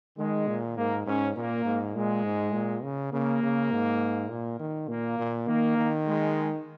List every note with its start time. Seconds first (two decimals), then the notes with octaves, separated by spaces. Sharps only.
0.18 D#3 G#3
0.48 A#2
0.77 G#2 A#3
1.06 G#2 C#4
1.36 A#2 A#3
1.65 G#2
1.95 A#2 G#3
2.24 G#2
2.54 A#2
2.83 C#3
3.13 C#3 A#3
3.43 C#3
3.71 G#2
4.30 A#2
4.59 D#3
4.89 A#2 A#3
5.19 A#2
5.47 D#3 A#3
5.77 D#3
6.06 G#3